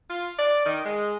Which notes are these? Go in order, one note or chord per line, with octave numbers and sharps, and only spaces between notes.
F4
D5
D#3
G#3